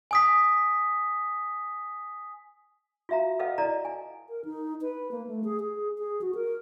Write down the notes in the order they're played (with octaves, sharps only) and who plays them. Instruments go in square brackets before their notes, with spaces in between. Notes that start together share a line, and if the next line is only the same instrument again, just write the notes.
[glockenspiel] G#5 D#6 B6
[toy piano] F4 F#4 E5 F5 A#5
A4 B4 D#5 F5 F#5
E4 A4 D5 D#5 A#5
G#5
[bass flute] A#4
D#4
B4
A#3
A3
G#4
G#4
G#4
F#4
A#4